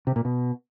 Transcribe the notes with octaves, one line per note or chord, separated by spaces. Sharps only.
C3
A#2
B2